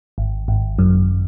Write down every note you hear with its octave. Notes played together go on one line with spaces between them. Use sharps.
G#1
G#1
F#2